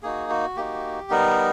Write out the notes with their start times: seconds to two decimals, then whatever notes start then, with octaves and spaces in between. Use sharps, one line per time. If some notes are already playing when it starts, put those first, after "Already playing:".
0.03 A#3 D#4 F#4 G#4
0.30 F#4
0.56 A#3 D#4 F#4 G4
1.10 G3 B3 D#4 A#4